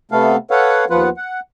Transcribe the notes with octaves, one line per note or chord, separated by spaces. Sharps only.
C3 A3 B3 A4 F5
A4 B4 C#5 F5 F#5
D#2 F3 B3 F4 B4 F#5
F#5